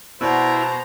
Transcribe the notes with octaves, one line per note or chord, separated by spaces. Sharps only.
B2 B3 E4 C5 D5 F#5 A#5